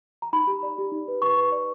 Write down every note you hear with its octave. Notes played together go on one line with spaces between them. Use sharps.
A#5
D#4 B5
G4
D5
G4
D#4
B4
B4 C#6
B4
D5